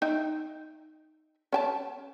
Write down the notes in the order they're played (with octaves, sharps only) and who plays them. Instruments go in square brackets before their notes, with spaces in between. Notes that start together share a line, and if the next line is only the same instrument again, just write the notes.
[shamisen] D#4 E5 G5
C#4 G5 A5